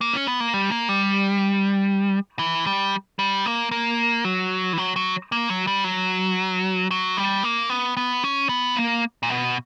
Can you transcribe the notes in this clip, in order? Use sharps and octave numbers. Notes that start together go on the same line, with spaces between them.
A#3
C#4
B3
A#3
G3
A#3
G3
E3
G3
G3
A#3
A#3
F#3
E3
F#3
F#3
A#3
F#3
G3
F#3
F#3
G3
A#3
B3
B3
C#4
B3
A#3
A#2
B2